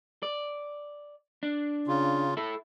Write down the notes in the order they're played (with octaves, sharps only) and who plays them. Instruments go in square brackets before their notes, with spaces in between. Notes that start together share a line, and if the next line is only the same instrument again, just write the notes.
[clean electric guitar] D5
D4
[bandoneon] C#3 F4
[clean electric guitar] E4 A4